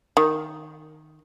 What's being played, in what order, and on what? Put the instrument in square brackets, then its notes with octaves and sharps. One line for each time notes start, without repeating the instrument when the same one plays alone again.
[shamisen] D#3